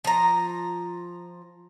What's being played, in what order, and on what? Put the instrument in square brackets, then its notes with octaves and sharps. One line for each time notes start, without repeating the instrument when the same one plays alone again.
[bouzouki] F3 A#5